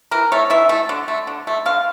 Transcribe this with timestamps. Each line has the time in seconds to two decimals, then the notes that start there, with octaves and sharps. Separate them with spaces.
0.11 E3 A#4
0.32 A3 C#5
0.50 E3 E5
0.69 A3
0.89 D3
1.08 A3
1.27 D3
1.47 A3
1.66 D3 F5